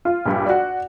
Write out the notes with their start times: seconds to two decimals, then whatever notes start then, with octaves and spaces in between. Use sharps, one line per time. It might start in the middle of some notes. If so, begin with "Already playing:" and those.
0.05 F4
0.25 A#1 G2
0.46 F#4 D5